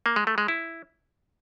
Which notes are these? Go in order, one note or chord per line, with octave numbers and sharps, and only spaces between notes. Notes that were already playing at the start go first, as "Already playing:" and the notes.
A#3
G#3
A3
G#3
E4